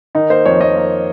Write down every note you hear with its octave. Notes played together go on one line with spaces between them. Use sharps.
D#3 D#4
A#3 C5
F2 C#5
F2 D#5
A#3